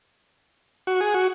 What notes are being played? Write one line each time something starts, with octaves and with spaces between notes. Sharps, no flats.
F#4
G#4
F#4